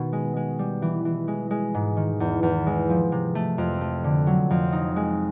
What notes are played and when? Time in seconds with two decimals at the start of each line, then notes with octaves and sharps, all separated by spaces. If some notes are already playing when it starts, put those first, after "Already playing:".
Already playing: B2 D#3
0.13 G#3
0.37 G#3
0.59 G3
0.82 E3
1.05 E3
1.28 G#3
1.51 G#3
1.74 G#2
1.97 D#3
2.20 E2
2.43 E2
2.67 G#3
2.89 F3
3.12 C3
3.35 A3
3.58 F2
3.81 A3
4.04 D3
4.27 F#3
4.50 F2
4.73 D#4
4.96 G#3